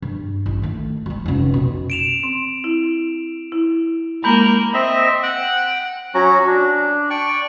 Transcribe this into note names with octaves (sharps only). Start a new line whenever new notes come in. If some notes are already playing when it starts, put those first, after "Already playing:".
G2
A1
D#3 A3
F#3 G3
F1 C#3
B2
D7 E7 F7
C4
E4
E4
G#3 A#3 A#4 B5 G6 F#7
C4 D#5 E5
F#5 G5
F#3 C#4 F#4 A#5
D4
D5 G5 C#6